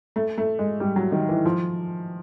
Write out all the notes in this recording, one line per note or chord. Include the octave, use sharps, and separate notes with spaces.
A3
A3
G#3
G3
F#3
D#3
E3
F3